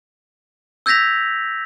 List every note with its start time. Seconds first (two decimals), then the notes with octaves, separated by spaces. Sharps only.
0.86 E6 G6 G#6 A#6 B6 F7